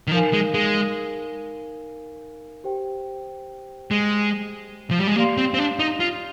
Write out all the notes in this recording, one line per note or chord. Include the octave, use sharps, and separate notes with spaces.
D#3
F3 D#4 A#4 F5 G#5
G#3
G#3
G4 C5 G5
G#3
F3
G3
G#3
A#3 G4 D5 F5 C6
C4
C4
D4
D#4
F4